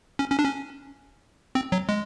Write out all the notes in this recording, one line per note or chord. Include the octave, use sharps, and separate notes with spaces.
C#4
C#4
D4
C#4
C4
F#3
G#3